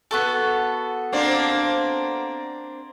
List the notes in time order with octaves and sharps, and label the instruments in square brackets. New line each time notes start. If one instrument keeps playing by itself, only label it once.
[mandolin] B3 F#4 A4
[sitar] A#3 C4 D4